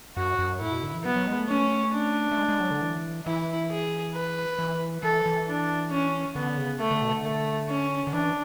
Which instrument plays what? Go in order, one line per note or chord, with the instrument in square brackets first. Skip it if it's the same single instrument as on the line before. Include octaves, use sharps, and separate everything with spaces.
[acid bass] F#2 [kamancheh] F#4
[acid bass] F#2
[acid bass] A2 [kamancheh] E4
[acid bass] B2
D3
E3
[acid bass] F#3 [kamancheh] B3
[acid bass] F#3
G#3
A3
[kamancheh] C#4
D4
[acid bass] A3
G#3
G#3
F#3
D3
E3
[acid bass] E3 [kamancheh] E4
[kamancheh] G#4
B4
[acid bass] E3
[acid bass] E3 [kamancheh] A4
[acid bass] E3
[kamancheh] D4
C#4
[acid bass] D3 [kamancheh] B3
[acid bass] C#3
[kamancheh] A3
[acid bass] D3
B2
D3
[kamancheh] A3
C#4
[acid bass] D3
[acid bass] E3 [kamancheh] D4